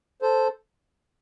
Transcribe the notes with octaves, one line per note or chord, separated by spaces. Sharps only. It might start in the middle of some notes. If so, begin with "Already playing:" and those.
A4 C5